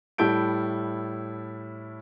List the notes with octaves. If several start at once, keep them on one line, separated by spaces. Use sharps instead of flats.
A2 G3 E4 A4 G6 D7